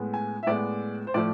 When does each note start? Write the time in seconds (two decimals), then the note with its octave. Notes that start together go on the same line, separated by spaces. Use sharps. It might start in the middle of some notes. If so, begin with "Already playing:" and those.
Already playing: A2 G#3 B3
0.14 G#5
0.43 E5
0.46 A2 G#3 B3 D5
1.07 C5
1.14 A2 F3 A3 D5